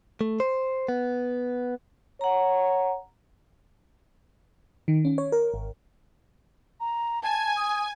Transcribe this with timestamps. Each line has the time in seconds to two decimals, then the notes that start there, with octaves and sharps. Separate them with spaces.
0.21 A3
0.40 C5
0.88 B3
2.21 C#5 F#5 A#5
4.88 D#3
5.05 C#4
5.18 C#5
5.32 A#4
5.54 G#1
6.80 A#5
7.23 G#5 A5
7.56 D#6